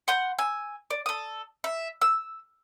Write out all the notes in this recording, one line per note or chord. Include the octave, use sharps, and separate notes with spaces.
F#5 C6 G6
G#5 E6
D5
A4 D#6
E5
E6